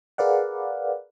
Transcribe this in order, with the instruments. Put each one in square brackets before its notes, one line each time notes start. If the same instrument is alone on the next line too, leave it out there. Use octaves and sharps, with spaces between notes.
[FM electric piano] G#4 A#4 B4 D5 F5 F#5